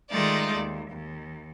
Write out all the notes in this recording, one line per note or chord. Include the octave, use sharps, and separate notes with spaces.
D#3 G#3 A3 D#4 F4 D5
D#2
D#2